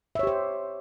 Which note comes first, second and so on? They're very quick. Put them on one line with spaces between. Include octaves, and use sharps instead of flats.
E5 C#5 G4 C5